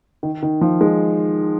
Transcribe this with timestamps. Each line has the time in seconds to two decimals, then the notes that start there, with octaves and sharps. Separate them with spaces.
0.23 D#3
0.43 D#3
0.61 F3
0.81 G#3